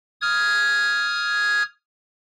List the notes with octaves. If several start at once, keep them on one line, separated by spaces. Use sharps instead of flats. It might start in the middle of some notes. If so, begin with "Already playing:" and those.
D#6 F6 G#6